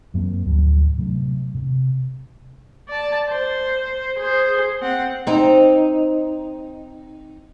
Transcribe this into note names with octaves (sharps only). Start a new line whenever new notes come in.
F#2 F#3 A#3 C4
D2 A2 F3 F#3
C3 F#3 A3
C3
D5 A5
C5
G#4 C5
C4 F#5
C4 D#4